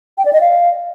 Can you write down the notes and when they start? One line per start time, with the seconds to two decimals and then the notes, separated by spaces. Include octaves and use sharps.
0.18 G5
0.25 D5
0.33 D#5
0.41 F5